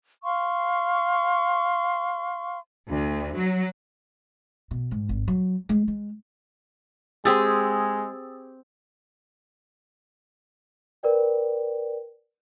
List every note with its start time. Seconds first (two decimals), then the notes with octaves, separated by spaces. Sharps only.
0.24 F5 C6 C#6
2.89 D2
3.36 F#3
4.71 B2
4.91 G#2
5.09 G#1
5.28 F#3
5.69 G#3
5.88 G#3
7.25 G#3 C4 G4 G#4 D#6 E6 A6
11.03 A#4 B4 D5 G5